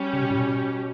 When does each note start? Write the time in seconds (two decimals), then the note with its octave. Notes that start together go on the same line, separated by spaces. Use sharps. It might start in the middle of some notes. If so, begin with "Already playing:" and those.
Already playing: G3 C#4 G4
0.13 C#3
0.22 B2
0.31 A2
0.39 B2